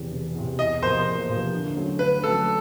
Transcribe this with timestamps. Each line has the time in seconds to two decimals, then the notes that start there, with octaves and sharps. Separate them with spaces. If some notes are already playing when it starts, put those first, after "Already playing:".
Already playing: E1 E2 C3
0.11 E1
0.35 E2 C3
0.59 E2 D#5
0.82 C3 F3 A#3 C5
1.06 E2
1.29 C3 F3 A#3
1.53 D3
1.76 F#3 A3 C#4
1.99 D3 B4
2.23 F#3 A3 C#4 A4